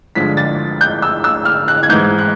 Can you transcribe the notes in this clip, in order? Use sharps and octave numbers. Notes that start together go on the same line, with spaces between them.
G2 D3 F3 G#3 B6
A6
G6
E6
E6
F6
F#6
G#6
G#2 E3 G#3 G6
F#6